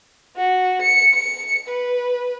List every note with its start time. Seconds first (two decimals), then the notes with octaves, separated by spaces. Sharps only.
0.37 F#4
0.82 C#7
1.14 C#7
1.68 B4